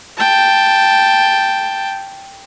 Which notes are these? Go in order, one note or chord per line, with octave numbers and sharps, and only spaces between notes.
G5 A5